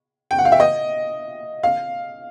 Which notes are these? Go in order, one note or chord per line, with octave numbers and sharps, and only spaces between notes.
G5
F#5
F5
E5
D#5
F5